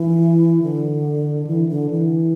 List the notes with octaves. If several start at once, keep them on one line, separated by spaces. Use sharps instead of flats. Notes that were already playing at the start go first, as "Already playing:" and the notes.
Already playing: E3
D3
E3
D3
E3